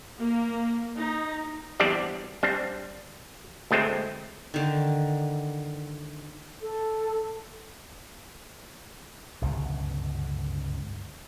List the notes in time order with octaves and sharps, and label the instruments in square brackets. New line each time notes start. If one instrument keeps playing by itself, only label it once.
[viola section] A#3
D#4
[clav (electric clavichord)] E2 G3 C4 D4 G4 D5
G3 C4 D4
D2 G#3 A3 C4
[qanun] D3 D#3
[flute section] A4
[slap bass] G1 C#2 F#2 B2